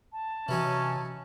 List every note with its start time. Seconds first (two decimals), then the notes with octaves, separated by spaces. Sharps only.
0.12 A5
0.48 C3 E3 F#3 C#4 D#4